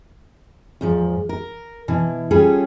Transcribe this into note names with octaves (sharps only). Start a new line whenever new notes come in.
E2 G#2 F3
A#4
B2 E3
G3 C#4 F4 G#4 A4